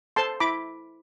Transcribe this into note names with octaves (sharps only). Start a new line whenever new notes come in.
A4 C5 A5 C6
E4 B5 D6